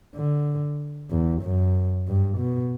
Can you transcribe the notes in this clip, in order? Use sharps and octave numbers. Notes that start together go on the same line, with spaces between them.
D3
E2
F#2
G2
B2